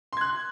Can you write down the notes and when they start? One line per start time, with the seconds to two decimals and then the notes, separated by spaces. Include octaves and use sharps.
0.13 C6
0.17 G#6
0.21 F#6